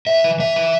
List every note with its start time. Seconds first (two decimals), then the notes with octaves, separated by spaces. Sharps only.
0.07 E2 E5
0.24 E3
0.39 E3 E5
0.56 E3